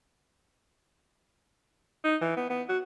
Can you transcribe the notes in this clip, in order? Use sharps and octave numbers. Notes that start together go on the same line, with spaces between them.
D#4
E3
B3
B3
F#4